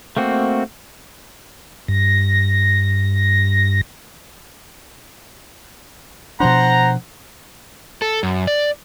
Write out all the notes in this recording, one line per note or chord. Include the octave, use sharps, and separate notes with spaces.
A3 A#3 C4 F#4
G2 A#6
B2 F3 D4 C5 F#5 A#5
A4
F#2
D5